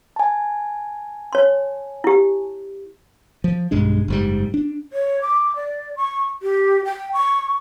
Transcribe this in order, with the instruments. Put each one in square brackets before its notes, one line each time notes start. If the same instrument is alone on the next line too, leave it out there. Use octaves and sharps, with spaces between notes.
[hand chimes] G#5 A5
[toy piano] C#5 C6
E4 G4
[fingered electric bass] F3
B1 G2 G#3 D4
F#1 G#2 G3
D4
[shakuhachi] C#5
D6
D5
C#6
G4
G5
C#6